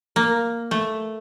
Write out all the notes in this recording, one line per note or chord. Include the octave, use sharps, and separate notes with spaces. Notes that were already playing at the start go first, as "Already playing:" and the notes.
A#3
A3